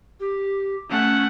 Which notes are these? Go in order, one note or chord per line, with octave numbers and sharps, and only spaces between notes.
G4
A3 C#4 F#5